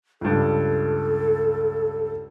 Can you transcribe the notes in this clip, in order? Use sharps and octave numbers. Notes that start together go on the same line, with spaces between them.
C#2 G2 A4